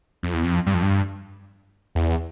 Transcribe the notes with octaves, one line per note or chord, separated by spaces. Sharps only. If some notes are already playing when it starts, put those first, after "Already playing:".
F2
E2
F2
G2
F2
G2
E2